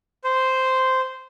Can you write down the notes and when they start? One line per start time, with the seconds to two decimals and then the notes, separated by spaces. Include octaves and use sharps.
0.24 C5